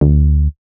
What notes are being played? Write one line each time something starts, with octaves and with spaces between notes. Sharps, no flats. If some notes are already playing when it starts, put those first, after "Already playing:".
D2